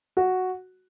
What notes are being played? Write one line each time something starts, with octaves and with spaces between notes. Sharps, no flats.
F#4